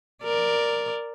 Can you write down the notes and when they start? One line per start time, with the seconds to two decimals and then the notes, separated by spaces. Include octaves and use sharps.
0.24 A#4 D5